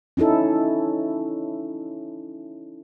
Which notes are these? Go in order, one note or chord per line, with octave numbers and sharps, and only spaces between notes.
C#4 D#4 E4 A4